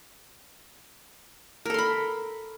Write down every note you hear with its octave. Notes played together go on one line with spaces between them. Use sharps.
A4 A#4 B5 C6